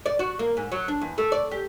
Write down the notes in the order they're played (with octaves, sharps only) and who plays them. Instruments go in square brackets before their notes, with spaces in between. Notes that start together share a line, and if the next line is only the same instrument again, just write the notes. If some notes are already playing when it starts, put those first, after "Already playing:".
[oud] D5
F#4
A#3
G#2
F#3
D4
E2
A3
D5
G4